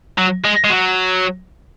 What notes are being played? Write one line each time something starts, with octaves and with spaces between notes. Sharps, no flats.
F#3
G#3
G#3
F#3